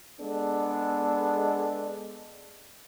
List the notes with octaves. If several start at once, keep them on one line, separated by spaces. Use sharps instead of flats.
G#3 B3 D4 A4